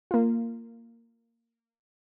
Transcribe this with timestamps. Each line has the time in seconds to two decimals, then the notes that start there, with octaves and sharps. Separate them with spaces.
0.11 A#3 F4